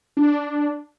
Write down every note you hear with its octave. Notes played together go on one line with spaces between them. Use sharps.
D4